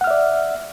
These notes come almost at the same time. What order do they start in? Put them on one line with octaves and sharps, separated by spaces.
F#5 F6 E5 D5